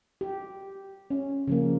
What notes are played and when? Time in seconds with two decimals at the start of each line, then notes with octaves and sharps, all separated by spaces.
0.21 G4
1.10 C#4
1.47 C#3 F3 A#3